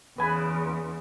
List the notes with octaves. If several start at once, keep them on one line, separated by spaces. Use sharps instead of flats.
E2 C#3 B4 G#5 B5